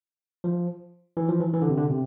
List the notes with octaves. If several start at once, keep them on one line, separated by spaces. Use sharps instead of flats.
F3
E3
F3
E3
E3
D3
C3
D3
C3